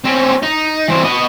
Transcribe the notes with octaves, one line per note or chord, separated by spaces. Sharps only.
C4 C#4
D#4
E3 C4
B3 D#5